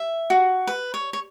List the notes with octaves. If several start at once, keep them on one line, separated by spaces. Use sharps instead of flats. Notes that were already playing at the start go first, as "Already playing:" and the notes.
Already playing: E5
F#4
B4
C#5
C#5